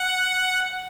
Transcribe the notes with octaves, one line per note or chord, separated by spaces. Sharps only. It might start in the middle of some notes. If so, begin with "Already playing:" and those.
Already playing: F#5